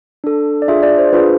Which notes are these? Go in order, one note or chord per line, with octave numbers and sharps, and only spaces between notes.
D4 A4
D5
D4 F4 G#4 E5
D5
C5
D4 F4 G#4 B4